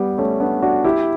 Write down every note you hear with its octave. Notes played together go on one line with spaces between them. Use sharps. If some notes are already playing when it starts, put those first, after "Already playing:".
Already playing: G3 B3
A3 C#4
B3 D4
D4 F#4
E4 G4